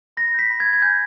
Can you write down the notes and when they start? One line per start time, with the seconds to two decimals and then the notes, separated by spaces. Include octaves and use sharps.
0.17 B5 A#6
0.34 G6 B6
0.50 B5
0.60 G#6
0.66 G6
0.73 G#6
0.82 G#5 G6